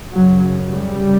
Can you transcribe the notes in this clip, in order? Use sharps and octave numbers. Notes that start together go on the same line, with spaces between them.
F#2 C#3 F#3
G3